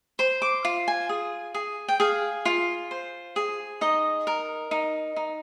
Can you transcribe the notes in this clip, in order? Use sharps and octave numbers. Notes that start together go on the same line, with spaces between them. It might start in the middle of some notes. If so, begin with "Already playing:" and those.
C5 C6
D6
F4
G#5
G#4
G#4
G5
G#4 F5
F4
C5
G#4
D#4 D#5
A#4
D#4
D#4